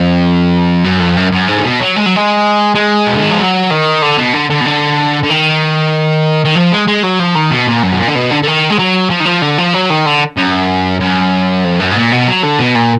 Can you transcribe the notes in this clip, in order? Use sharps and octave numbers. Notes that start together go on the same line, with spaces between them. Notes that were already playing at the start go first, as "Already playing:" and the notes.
Already playing: F2
F#2
F2
F#2
F#2
G#2
D3
B2
F#3
G#3
F#3
G#3
G#3
B2
D3
D#3
F3
F#3
D#3
D3
B2
D3
D3
B2
D3
D3
D#3
D#3
F3
G#3
G#3
F#3
F3
D#3
B2
A#2
F#2
B2
A#2
D3
B2
D3
D3
D#3
G#3
F#3
F3
D#3
F3
D3
F3
F#3
D#3
D3
F#2
F#2
F2
F#2
G#2
A#2
B2
F#3
D3
B2
A#2